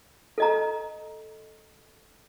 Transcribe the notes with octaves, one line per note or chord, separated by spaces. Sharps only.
A4 D#5 A#5